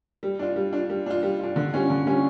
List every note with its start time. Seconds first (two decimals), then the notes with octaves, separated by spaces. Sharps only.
0.23 G3
0.39 D4 F4
0.56 G3
0.73 D4 F4
0.90 G3
1.06 D4 F4
1.23 G3
1.39 D4 F4
1.56 D3
1.73 G3 C#4 F4
1.90 D3
2.07 G3 C#4 F4